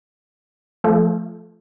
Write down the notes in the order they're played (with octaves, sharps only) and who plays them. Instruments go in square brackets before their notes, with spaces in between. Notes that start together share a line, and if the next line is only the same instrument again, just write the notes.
[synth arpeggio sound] F3 A3